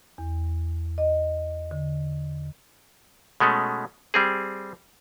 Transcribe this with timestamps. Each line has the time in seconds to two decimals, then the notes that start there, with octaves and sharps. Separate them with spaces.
0.18 E2
0.98 D#5
1.71 D3
3.40 B2 G#3 A3 C#4
4.14 G3 C4 G#4